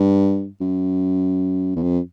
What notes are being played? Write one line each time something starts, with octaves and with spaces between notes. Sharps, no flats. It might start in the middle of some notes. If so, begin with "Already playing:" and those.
Already playing: G2
F#2
E2
F2